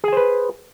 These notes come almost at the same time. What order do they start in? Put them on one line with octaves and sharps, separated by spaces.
G#4 G#5 C5 B4